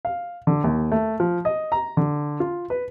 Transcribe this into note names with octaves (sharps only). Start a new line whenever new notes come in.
F5
D3
D#2
A3
F3
D#5
A#5
D3
F4
B4